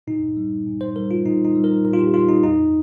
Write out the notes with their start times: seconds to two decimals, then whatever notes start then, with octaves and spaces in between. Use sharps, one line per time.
0.07 A#2 D#4
0.37 G3
0.66 A#2
0.81 C5
0.96 G3 A#4
1.11 F4
1.25 A#2 D#4
1.44 D#4
1.55 G3
1.64 A#4
1.84 A#2 A#4
1.93 F4
1.99 G4
2.14 G3 F4
2.28 D#4
2.43 F2 D#4